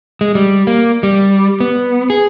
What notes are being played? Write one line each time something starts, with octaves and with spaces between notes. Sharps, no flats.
G#3
G3
A#3
G3
B3
G#4